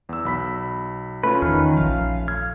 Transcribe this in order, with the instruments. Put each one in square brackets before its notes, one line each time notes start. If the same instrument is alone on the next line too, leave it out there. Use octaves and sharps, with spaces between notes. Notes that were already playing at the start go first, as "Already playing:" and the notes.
[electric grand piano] E2 E6
B1 B5 B6
[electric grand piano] A3 C#4 F4 [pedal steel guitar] B4
[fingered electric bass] E2 [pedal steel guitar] D#3 F6
[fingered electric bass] A#1 F3 [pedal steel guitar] F5
[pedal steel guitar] F6 [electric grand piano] G#6